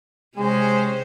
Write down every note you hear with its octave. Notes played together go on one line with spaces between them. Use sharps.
C3 G#3 C#4 C5